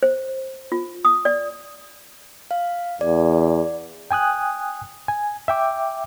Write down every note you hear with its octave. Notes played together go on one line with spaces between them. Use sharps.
C5
F4
D#6
D5
F5
E2 D5
G5 G#5 D#6 F#6
G#5
E5 G5 D6